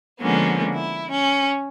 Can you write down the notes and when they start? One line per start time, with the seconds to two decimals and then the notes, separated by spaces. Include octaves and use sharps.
0.21 D3 F3 G#3 A#3 B3 C#4
0.75 E4
1.12 C#4